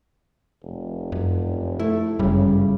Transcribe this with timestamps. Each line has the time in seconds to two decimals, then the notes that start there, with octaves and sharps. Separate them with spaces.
0.64 F1
1.12 F#2
1.80 A3 E4
2.19 G1 F#2 C#3 G3